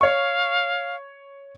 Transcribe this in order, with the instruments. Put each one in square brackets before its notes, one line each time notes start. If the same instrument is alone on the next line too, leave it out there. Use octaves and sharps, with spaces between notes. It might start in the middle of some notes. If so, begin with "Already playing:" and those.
[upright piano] C#5 C#6 [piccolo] F5